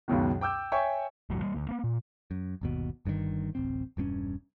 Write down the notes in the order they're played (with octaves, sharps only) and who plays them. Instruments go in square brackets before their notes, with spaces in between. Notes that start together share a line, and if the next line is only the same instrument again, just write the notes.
[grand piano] C#2 F#2 B2 D#3
G5 D6 E6 G6
C#5 E5 G5 G#5 C#6
[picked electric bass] E1 A1 A2 F#3
G3 A#3
D2
A#3 B3
A#2
F#2
G1 D#2 B2
G1 G2 B2 D#3
D1 A1 C4
E1 G2 C4 C#4